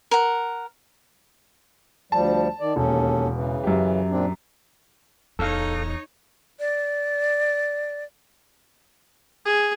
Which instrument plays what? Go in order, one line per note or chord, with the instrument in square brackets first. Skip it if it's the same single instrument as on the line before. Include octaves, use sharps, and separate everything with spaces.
[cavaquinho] A#4 F#5
[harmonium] D2 F3 G3 [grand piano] A5
[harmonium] D#3 D5
[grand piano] E1 [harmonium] D#2 C#4 A4
[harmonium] C#3 E3
[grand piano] F#2 G4
[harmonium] A#2 C4 D4
[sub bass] D1 [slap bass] E2 [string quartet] D#4 C#5 A#5 [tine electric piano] A4 F5
[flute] D5
[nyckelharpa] G#4